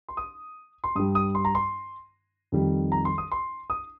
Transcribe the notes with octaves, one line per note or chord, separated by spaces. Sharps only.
C6
D#6
C6
G2 G3 D#6
D#6
C6
A#5
C6
F2 D#3 G3
A#5
C6
D#6
C6
D#6